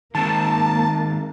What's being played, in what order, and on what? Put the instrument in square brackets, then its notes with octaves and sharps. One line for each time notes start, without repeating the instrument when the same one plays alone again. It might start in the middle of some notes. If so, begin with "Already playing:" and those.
[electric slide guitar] D#3 G#3 C4 [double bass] A#3 [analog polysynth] A5